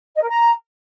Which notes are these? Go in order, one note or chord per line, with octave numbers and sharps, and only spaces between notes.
D#5
A#4
A#5